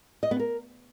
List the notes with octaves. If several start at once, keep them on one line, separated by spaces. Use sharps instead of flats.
D#5
B3
A#4